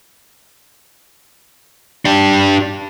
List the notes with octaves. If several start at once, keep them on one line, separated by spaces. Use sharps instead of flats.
D4 G4